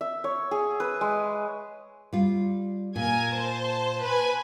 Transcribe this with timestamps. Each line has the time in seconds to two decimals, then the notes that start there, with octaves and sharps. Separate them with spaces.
0.01 E5
0.24 C#5
0.51 G#4
0.80 B4
1.01 G#3
2.13 G3 F4
2.96 A#2 A#4 G#5 G#6
3.32 C5 A5
4.04 B4 G#5